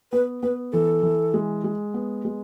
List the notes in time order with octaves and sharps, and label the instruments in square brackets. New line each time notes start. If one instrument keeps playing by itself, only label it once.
[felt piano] B3 [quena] B4
[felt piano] B3 [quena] B4
[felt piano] E3 [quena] A4
[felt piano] E3
G#3
G#3
B3
G#3